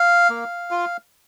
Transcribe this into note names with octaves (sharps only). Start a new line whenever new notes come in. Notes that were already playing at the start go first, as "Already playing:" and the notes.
Already playing: F5
A#3
F4